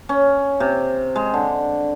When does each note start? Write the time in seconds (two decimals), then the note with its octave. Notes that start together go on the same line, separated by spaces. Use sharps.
0.09 C#4
0.60 C3
1.15 G#3
1.34 D3